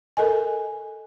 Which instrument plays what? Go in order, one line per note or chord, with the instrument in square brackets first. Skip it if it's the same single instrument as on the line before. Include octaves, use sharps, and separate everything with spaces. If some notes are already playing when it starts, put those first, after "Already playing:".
[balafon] A4 A#4 D#5 G#5